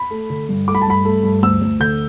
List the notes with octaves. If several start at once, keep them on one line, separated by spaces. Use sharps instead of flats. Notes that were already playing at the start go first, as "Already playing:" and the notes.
Already playing: B5
A3
D3
G2
A3 D6
B5
A5
G2 B5
A3
G2
D2 E6
D2
D3 G6